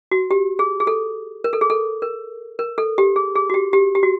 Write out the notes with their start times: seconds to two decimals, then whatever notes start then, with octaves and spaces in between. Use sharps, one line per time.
0.11 F#4
0.31 G4
0.59 G#4
0.80 G#4
0.87 A4
1.44 A#4
1.53 A4
1.61 G#4
1.70 A4
2.02 A#4
2.59 A#4
2.78 A4
2.98 G4
3.16 G#4
3.35 G#4
3.50 F#4
3.54 G4
3.73 G4
3.95 G4
4.03 F#4